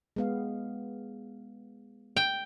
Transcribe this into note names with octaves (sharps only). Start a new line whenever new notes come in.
G#3 B3 F5
G5